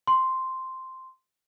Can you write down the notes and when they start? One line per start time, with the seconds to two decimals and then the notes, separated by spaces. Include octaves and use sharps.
0.07 C6